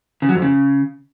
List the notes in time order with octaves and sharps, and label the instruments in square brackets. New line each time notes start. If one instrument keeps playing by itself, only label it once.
[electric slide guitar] C#3
F#3
F2
C#3